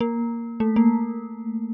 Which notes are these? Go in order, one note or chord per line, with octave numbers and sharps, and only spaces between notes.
A#3
A3
A#3